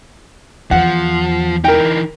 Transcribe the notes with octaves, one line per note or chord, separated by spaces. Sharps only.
E2 F3 F#5
E3 D#4 A#4 G5